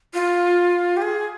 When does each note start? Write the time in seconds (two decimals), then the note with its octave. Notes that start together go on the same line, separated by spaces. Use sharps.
0.14 F4
0.97 G4
1.02 G#4